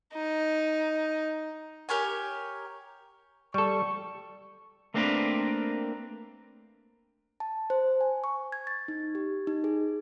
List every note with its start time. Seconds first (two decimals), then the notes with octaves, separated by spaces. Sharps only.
0.14 D#4
1.89 G4 A#4 C#5 G#5
3.54 G3 A4 C#6
4.94 A3 A#3 C4 D4 A#4 B4
7.40 A5
7.70 C5
8.01 G#5
8.24 C#6
8.52 G#6
8.67 A6
8.88 D#4
9.15 G4
9.47 D#4
9.64 G#4